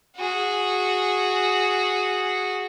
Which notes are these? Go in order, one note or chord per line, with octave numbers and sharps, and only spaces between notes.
F#4 G#4